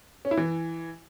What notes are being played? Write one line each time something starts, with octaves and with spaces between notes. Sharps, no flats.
C#4
E4
E3